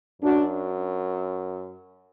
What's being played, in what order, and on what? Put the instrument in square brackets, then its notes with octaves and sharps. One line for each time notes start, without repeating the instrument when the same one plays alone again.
[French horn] F#2 [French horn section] D4 F#4